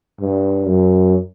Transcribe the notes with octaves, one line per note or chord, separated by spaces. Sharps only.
G2
F#2